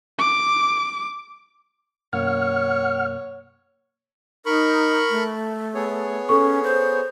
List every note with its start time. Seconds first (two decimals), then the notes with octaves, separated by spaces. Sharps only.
0.19 D6
2.13 F#2 B2 A#3 C#5 F#5 F6
4.46 D#4 A#4 B5 C#6
5.10 A3
5.74 B3 G#4 C#5
6.29 C#4 A4 C#6
6.64 C5